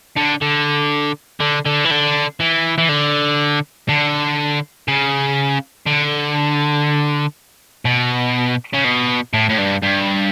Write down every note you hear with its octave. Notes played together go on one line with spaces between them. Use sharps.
D3
D3
D3
D3
E3
D3
E3
E3
D3
D3
C#3
D3
B2
C#3
B2
A2
A2
G2
G2